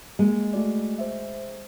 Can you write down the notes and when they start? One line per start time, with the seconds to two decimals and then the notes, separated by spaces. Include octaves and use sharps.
0.19 G#3 A#3
0.53 A3 F#4 D5
0.98 C5 E5